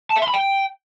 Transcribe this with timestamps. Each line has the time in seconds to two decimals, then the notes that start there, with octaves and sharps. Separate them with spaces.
0.10 A5
0.16 E5
0.22 C6
0.28 B5
0.34 G5